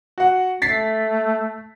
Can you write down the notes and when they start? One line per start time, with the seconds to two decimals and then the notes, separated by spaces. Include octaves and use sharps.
0.18 F#4 F#5
0.62 A3 A6 B6 C7